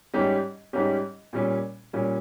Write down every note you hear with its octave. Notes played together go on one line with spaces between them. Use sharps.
G#2 G3 C#4 G4
G#2 G3 C#4 G4
A#2 G3 C#4
A#2 G3 C#4